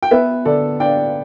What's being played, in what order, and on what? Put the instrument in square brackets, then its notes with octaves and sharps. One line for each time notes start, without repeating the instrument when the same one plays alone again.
[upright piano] G5
B3 B4 E5
D3 A4 D5
D4 D5 G5